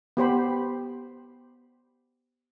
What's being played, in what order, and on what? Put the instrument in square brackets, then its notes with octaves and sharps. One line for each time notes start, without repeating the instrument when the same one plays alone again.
[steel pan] B3 G4 C5 B5